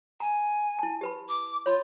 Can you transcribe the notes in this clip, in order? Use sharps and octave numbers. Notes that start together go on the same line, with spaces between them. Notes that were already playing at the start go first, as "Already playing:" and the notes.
G#5 A#5
E4 A5
G4 B4 B5
D6
F4 C#5 B5